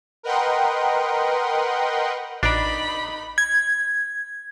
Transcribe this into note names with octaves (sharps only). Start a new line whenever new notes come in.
A#4 B4 D#5 F#5 G5 C6
A1 D4 D#4 D5 B5
G#6